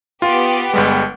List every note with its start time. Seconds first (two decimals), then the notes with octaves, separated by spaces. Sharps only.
0.22 B3 F4 G4
0.74 G1 G3 G#3